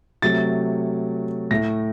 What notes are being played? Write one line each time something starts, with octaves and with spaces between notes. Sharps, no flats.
C3 F#3 A3 A6
A2 A3 A#6